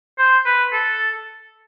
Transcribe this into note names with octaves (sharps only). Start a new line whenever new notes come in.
C5
B4
A4